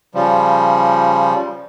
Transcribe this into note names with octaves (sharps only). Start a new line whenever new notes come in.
C#3 F3 G3